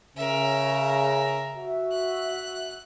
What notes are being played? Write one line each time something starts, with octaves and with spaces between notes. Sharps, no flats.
C#3 A#4 E5
F#4 E5
F#6